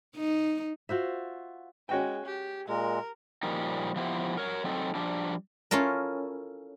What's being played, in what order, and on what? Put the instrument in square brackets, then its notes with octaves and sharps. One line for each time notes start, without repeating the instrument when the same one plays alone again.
[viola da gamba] D#4
[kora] F4 F#4 C5 E5
[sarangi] G#3 [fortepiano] C#4 F#4 G5
[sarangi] G4
[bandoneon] A#2 G#3 [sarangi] A#4
[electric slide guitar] A#2 F3 G3 A#3 D#4
F3 B3 E4 G4 A4 C5
A#4 C#5
F#3 C4 D#4 A4
F3 G3 D4
[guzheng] C#4 E4 F4 A4 A#4